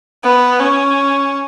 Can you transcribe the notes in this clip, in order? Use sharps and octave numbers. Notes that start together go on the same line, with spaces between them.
B3
C#4